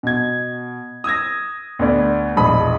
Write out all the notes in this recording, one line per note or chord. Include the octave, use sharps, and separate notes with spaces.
B2 G#6
D#6 E6 G#6 A#6
D2 B3 D5
E1 A#1 G#3 B5 D#6